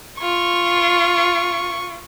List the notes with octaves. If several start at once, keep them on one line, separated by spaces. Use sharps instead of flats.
F4 C#6